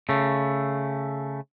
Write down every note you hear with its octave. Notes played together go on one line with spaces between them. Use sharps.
C#3 A3